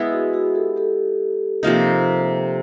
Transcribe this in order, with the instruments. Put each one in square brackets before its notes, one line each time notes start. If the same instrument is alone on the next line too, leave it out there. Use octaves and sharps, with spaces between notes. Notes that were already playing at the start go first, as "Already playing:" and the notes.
Already playing: [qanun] G#3 B3 E4
[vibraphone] F#4 G#4
F#4 G#4
G4 A4
G4 A4
[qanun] C3 F3 A#3 D#4